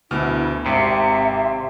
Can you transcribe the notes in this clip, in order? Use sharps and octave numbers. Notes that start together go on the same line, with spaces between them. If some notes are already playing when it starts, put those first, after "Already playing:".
D2 B2 E4 F6
G#1 C3 E5